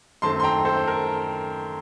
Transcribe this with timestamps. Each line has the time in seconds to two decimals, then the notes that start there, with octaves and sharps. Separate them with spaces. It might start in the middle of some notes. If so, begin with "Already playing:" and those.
0.22 F#2 D#3 A3 C4 A5 C6
0.40 C6
0.44 G5 A#5
0.65 A4 C5
0.87 A#4